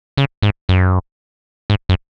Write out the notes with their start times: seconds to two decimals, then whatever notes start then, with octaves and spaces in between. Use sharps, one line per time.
0.17 C#3
0.43 G#2
0.69 F#2
1.70 G#2
1.89 F#2